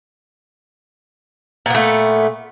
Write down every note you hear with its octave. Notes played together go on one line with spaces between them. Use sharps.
A#2 A3 B3